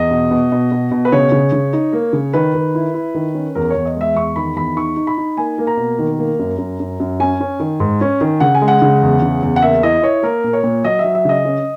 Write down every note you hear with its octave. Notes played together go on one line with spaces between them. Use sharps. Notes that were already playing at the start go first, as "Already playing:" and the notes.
Already playing: E2 D#5
B2
B2
B2
B2
B2
B4
C#3 C#5
C#3
C#3
D#4
A#3
C#3
D#3 B4
D#3
E4
E4
D#3
C#4
E2 A#4
E2 C#5
D#5
G#3 E5
E2 C#6
D#3 B5
E2 B5
D#4 C#6
D#4
B5
D#4
A#3 G#5
A#3
A#5
B2
D#3
A#3
F#2
F#2
F#2
F#2
C#4 G#5
C#4
D#3
G#2
C#4
D#3
C#3 F#5
G#5
G#3
F#5
C#3
E2
C#3
E2
F#5
A#3 E5
E4 D#5
E4 C#5
A#3 A#4
A#2
C#5
A#2
F#3 D#5
E5
F#3
E5
C#3 D#5
C#4